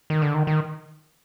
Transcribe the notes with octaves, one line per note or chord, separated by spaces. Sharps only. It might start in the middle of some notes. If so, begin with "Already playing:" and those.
D#3
D3
D#3
D#3